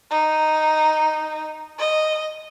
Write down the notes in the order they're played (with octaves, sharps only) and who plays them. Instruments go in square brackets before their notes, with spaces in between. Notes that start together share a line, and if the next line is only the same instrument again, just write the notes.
[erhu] D#4
D#5